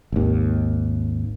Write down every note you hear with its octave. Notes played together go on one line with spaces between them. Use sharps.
G#1 D#2